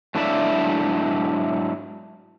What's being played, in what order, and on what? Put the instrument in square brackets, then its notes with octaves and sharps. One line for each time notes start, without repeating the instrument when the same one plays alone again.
[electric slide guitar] G#2 F#3 D4 E4 D5 E5